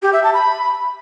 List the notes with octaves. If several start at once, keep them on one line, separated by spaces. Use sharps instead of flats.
G4
E5
A5
B5